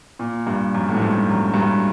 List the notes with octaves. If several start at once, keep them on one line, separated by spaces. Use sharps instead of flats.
A#2
G2
F#2
A2
G#2
G2
F#2
G2
F#2